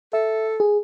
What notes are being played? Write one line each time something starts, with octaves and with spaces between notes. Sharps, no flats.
A4 E5
G#4